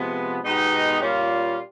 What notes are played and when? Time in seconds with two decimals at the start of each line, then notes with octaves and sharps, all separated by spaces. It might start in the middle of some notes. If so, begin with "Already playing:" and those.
Already playing: C3 F3 G#3 B3
0.42 B2 G#3 B3 D#4 G4
1.01 A#2 G3 A#3 C#4 F4